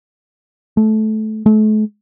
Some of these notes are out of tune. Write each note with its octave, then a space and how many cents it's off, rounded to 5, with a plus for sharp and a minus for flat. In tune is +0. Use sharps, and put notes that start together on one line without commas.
A3 -20
A3 -40